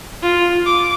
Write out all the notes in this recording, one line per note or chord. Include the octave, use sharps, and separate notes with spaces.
F4
D6